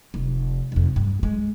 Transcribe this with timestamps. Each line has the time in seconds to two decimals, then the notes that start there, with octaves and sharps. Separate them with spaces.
0.14 F1
0.72 F1 F2
0.96 G2
1.23 G#3